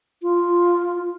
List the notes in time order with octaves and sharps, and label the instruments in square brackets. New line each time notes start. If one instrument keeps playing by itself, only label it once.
[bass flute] F4